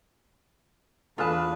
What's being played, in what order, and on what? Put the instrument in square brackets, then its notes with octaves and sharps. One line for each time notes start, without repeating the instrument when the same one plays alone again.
[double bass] E2 [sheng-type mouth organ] D4 B4 [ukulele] F4 A5 [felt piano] B5 D#6 F6